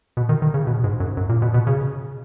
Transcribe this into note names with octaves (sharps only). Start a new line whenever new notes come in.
B2
D#3
D#3
C#3
B2
G#2
F#2
F#2
A#2
B2
B2
C#3